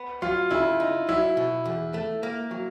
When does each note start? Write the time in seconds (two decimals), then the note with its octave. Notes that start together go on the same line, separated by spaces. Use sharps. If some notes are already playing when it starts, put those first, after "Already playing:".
Already playing: B3
0.22 F#3 F4
0.51 C#3 E4
0.80 D#4
1.09 F#3 E4
1.37 B2
1.65 E2
1.94 A3
2.23 A#3
2.51 F#3